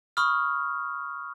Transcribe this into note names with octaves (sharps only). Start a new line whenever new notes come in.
B5 C#6 D#6 F6